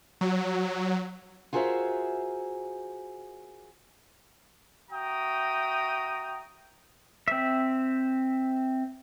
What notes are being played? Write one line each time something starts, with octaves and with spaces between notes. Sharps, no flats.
F#3
F4 F#4 G#4 A#4 C5 E5
F#4 E5 G5 A#5 D#6
C4 E5